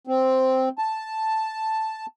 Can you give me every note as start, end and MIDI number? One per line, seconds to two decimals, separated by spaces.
0.07 0.69 60
0.78 2.06 81